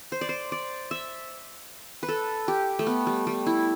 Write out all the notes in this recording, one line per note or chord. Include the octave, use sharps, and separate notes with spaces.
C5
D5
C5
D5
E5
B4
A4
G4
A3
B3
G3
G3
E4